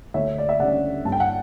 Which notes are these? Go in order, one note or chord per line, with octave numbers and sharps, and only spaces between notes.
D2 C#5 E5
D5
E5
C#3 G3 D4 D5 F#5
G2 A5
G5
F#5